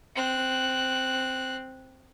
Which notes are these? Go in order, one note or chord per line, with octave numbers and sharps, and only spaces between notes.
C4 F#6